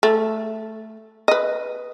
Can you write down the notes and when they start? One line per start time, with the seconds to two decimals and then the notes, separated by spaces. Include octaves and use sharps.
0.03 A3
1.28 B4 D#5